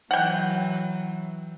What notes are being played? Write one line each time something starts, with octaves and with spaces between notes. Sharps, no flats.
E3 F#3 F#5 G5